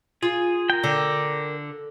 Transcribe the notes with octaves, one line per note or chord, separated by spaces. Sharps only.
F4 G#4
A#4 G5
D3